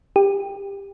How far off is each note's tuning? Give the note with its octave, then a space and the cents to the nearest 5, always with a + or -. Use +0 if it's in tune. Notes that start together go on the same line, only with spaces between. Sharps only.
G4 +20